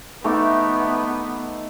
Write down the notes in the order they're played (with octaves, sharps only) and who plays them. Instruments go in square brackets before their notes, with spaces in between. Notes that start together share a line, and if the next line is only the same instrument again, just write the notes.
[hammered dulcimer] A3 D#4 D6 [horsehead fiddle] B3